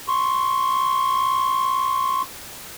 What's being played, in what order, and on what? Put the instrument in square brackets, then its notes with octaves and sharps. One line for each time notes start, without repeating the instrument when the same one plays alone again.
[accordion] C6 C#6